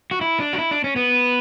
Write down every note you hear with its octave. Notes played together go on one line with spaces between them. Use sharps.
F#4
E4
D4
F#4
E4
D4
C#4
B3